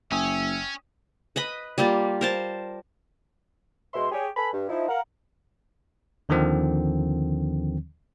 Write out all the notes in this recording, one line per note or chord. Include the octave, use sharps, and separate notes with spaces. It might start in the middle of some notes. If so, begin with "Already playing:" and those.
F#1 C#4 E5 G5 G#5 D#6
B4 D#5 B5
G3 A#3 F4 G4
A#4 C5 A5
B2 G#3 E5 C6
G4 G#4 C#5
A4 B4 G#5 B5
G2
F3 D#4 E4
A#4 F5 F#5
D#2 D3 D#3 F3 C4